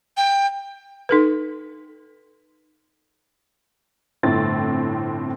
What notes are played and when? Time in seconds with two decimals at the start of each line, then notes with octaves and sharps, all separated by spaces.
0.17 G5
1.09 D#4 A4 B4
4.23 G1 A2 C4 A6